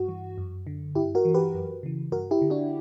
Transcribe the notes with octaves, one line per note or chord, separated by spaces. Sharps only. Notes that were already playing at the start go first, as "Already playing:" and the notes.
Already playing: G2 F#4
E3
F#2
D3
G2 E4 G4
F#4 A#4
E3
G4 B4
F#2
C#3 E3
G2 F#4 A#4
E4 G4
D3
D4 F#4